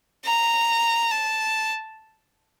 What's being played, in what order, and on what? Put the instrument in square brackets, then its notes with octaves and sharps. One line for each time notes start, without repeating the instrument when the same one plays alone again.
[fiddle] A#5
A5